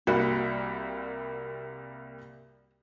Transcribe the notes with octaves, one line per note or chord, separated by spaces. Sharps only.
C2 G3 A#3 F#4